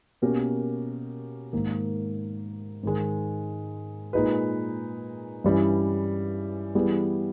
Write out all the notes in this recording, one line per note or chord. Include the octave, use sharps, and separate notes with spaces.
B2 A#3 C#4 G4 A#4
G#2 D#3 A#3
G#2 D#3 G#3
A#2 G#3 D#4 G#4 B4
G2 E3 G3 C#4 E4
E3 G3 B3 E4 G#4